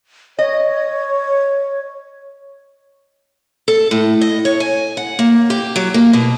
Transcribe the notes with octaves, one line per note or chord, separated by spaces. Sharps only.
C#5 D#5
A4
A2
D#5
C#5
G#5
F#5
A#3
G4
F#3
A#3
B2